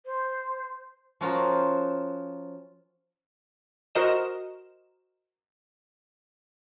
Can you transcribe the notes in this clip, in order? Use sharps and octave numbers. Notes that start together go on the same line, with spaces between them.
C5
F3 C#4 F4 F#4 A#4 C5
F#4 A#4 C5 D#5 E7